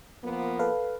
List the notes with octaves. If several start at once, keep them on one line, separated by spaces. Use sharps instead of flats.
F3 A#3 B3
A4 B4 F5